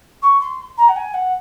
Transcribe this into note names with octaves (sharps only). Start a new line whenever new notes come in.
C#6
C6
A#5
F#5
G#5
F#5